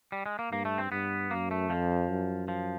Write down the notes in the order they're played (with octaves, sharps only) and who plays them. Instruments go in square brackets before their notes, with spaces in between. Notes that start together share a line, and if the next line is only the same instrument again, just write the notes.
[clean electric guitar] G3
G#3
A#3
[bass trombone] G2 [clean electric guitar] A#3
[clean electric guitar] A3
C4
[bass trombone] G2 [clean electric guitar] B3
[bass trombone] F#2 [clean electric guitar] A#3
[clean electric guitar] A3
[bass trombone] F2 [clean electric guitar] F3
[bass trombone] F#2
[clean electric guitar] F3